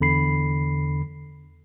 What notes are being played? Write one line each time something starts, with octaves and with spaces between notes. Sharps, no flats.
E2 D3 B5 C7